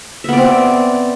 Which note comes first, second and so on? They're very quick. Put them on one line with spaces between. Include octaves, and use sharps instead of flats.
E5 B3 D5 C4